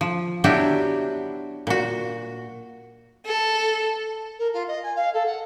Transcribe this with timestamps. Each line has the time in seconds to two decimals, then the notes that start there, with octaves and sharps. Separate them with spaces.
0.01 F3
0.44 F#3 B3 D4 E4 F#4 G4
1.67 A#2 F#4
3.26 A4
4.39 A#4
4.53 F4
4.67 D#5
4.82 G#5
4.95 F5
5.13 A4
5.25 F#5